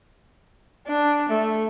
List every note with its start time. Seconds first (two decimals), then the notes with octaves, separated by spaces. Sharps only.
0.87 D4
1.29 A3